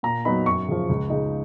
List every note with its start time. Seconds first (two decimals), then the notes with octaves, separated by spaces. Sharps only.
0.03 A#2 A#5
0.25 F#3 B3 D#4 B5
0.46 F#2 C#6
0.68 C#3 F3
0.89 C#2
1.10 C#3 G#3 D#4